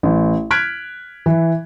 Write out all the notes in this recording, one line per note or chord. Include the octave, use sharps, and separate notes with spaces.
A1
F6 F#6 G#6 B6 D7
E3